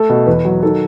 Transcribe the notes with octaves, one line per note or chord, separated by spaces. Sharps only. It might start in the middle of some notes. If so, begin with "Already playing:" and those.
Already playing: A3 A4
B2
E2 B4
F#3
D#3 A4